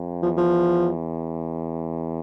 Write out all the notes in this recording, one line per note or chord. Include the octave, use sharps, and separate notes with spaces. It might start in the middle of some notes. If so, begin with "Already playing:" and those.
Already playing: F2
E2 F3
F3